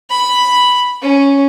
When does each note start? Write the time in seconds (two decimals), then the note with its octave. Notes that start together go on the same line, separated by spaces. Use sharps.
0.10 B5
1.02 C#4